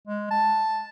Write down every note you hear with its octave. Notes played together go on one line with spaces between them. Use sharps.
G#3
A5